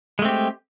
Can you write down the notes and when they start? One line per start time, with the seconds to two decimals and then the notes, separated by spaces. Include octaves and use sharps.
0.19 G#3
0.22 A3
0.25 C4
0.28 G4